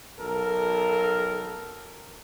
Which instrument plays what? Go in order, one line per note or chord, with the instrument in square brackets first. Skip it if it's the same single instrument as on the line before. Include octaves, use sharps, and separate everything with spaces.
[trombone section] B1 A4 A#4